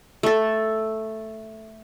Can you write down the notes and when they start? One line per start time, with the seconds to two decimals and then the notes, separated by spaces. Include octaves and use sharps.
0.23 A3 A4